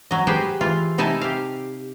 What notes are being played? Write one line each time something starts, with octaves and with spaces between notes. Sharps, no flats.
F#3 D#5
G4 G#4 B4 C5
E3 F4
C3 D#4 E4 G#5 A5
G4 F5